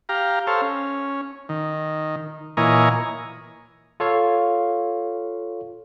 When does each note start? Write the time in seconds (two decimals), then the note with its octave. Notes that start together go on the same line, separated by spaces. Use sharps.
0.09 G4 F5 A#5
0.47 A4 C5 C#5 F5
0.62 C#4
1.49 D#3
2.57 A#2 E3 C#5 D#5 G#5 A#5
4.00 F4 A4 C#5 F5